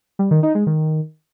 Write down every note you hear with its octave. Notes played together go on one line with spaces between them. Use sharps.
G3
D#3
D#4
G#3
D#3